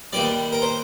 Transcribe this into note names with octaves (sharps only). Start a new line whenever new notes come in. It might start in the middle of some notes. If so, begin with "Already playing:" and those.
D#2 D#3 G3 D5
A#4
C5